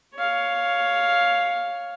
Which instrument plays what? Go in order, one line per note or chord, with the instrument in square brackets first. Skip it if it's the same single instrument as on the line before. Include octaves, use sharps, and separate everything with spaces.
[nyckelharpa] C#5 F5